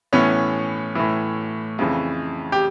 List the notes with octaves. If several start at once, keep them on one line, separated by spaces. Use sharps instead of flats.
A2 E3 B3 C#4
A2 E3
F2 C#3 E3
G4